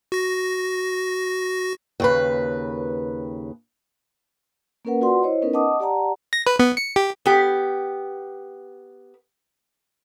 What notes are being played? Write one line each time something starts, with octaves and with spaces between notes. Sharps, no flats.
F#4 A#6
D#2 C#3 B4
A#3 C#4 A#4 B4 F#5
F4 F#4 B4 D5 F#5 C6
E4 C5 C#5 D#5
B3 C#4 D#4 A#4 B4
D#5 F#5 A5 D6 D#6
G4 D5 F#5 A5 A#5
A#6
B4
B3
C#7
G4
B3 G4